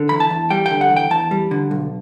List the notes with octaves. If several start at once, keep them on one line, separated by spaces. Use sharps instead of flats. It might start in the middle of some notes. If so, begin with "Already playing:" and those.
Already playing: D3
E2 B5
A5
E2
G3 G5
D3 G5
F#5
E2
G5
E2 A5
G3
D3
B1